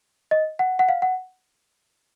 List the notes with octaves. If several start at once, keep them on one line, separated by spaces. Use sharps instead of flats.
D#5
F#5
F#5
F5
F#5